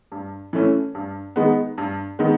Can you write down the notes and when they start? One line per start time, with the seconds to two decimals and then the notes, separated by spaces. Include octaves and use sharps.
0.12 G2
0.53 E3 A3 C#4
0.95 G2
1.36 D#3 G#3 B3
1.78 G2
2.19 D#3 G#3 B3